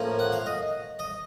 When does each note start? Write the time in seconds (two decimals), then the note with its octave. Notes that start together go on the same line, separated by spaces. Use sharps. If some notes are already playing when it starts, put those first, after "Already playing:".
Already playing: A2 F3 A#3 C#4
0.19 F#5
0.32 F5
0.46 D#5
0.99 D#5